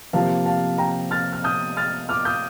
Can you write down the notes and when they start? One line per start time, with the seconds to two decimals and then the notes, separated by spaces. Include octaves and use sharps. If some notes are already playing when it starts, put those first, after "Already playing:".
0.13 C3 F3 A#3 F5 A5
0.45 F5 A5
0.78 G5 A#5
1.11 F6 A6
1.33 F6
1.44 D#6 G6
1.77 F6 A6
2.09 D6 F6
2.25 D#6 G6